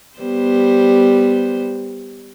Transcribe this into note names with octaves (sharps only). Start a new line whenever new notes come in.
G3 B3 C5